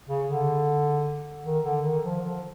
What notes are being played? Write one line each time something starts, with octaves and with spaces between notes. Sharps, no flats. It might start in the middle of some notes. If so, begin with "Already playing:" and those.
C#3
D3
D#3
D3
D#3
F3
F3